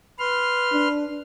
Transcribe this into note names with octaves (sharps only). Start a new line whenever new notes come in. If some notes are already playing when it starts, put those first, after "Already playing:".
B4 C6 F6
D4